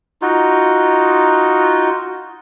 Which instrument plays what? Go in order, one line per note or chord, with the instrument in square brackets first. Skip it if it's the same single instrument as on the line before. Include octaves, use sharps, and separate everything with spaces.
[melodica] D#4 F4 F#4